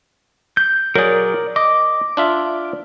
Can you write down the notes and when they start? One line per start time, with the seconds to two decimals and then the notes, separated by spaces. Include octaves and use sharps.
0.57 G6
0.96 F#3 G#4 A#4 D5
1.56 D#5 D6
2.17 D4 F4 E5